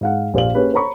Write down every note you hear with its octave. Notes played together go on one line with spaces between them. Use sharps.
G#2 F5 F#5
A#1 G4 C5 D5 F5 F#7
A#3 C#4 G4 G#4 B4
C5 C#5 A#5 B5 C#6